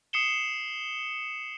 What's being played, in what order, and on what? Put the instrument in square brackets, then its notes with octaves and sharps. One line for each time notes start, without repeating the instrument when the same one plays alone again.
[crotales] D#6 C7 C#7 E7 G7